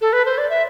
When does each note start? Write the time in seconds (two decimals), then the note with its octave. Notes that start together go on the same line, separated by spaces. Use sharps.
0.01 A4
0.13 B4
0.26 C5
0.38 D5
0.50 E5